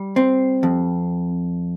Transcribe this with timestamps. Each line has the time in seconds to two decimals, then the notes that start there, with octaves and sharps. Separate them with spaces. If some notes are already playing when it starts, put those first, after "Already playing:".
Already playing: G3
0.16 C4
0.63 F2